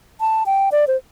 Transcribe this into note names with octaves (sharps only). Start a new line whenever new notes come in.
A5
G5
D5
C5